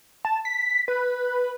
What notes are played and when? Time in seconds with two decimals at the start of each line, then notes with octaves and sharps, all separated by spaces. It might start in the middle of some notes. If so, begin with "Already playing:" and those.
0.25 A5
0.45 B6
0.88 B4